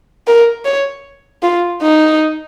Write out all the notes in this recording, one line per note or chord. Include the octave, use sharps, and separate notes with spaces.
A#4
C#5
F4
D#4